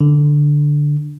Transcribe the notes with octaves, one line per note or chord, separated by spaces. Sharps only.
D3